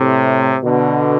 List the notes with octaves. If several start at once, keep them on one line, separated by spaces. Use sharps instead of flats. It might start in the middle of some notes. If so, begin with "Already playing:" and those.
Already playing: A2 C3
B2 D3